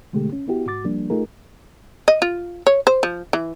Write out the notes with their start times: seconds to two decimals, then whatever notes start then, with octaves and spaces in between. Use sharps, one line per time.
0.13 B2 D3 G#3 A3 G4
0.33 C#4
0.48 B3 E4 F#4 G4
0.67 G#2 F#4 D6 A6
0.84 F3 G3 A#3 D4
1.10 A3 D#4 F4 G#4 A#4
2.08 D#5
2.22 F4
2.67 C#5
2.87 C5
3.03 F3
3.33 E3